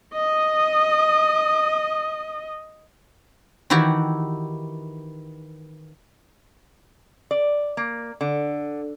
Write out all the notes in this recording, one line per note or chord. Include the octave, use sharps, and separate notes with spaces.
D#5 D#6
D#3 E3 E4 F#4 G4
D5
A#3
D3